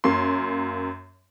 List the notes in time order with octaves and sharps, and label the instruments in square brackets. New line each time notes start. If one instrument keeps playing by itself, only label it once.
[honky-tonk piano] F#2 A#3 C6